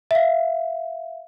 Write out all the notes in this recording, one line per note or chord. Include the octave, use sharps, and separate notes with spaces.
E5 F5